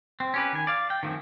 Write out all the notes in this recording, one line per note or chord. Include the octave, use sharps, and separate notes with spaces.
C4
C#4 G4 B4
D#3 G#5
D5 F5
G5
D#3 F3 A3 C4 C#4